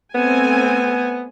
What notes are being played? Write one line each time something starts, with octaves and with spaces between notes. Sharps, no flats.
A3 B3 C4 G#5